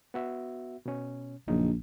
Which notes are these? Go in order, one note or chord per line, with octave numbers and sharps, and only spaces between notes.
B3 F#4 E5
B2 C#4
A#1 F#2 C#3 D#4